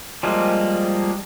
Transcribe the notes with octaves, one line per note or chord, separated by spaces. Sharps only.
F3 G3 G#3 A#3 C4